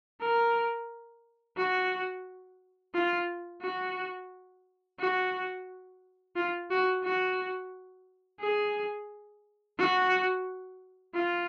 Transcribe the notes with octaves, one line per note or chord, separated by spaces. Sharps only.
A#4
F#4
F4
F#4
F#4
F4
F#4
F#4
G#4
F#4
F4